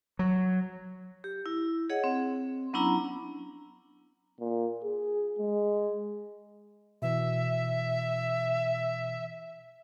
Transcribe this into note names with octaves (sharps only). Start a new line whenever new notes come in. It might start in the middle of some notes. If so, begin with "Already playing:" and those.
F#3
G4
E4
G#4 C#5 D#5 F#5
C4
F#3 B3 C#4 D4 E4 A#5
A#2
G#4
G#3
B2 E3 E5